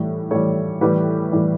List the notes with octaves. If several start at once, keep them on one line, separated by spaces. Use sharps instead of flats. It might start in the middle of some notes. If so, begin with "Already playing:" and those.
Already playing: A2 E3 G3
A2 E3 G3 A4 C#5
A2 E3 G3 G4 B4
A2 E3 G3